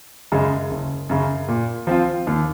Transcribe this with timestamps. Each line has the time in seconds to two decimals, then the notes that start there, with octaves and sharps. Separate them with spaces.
0.32 F#2 C#3 G#3
0.71 F#1
1.09 F#2 C#3
1.48 A#2
1.87 F3 C4 F4
2.27 D#2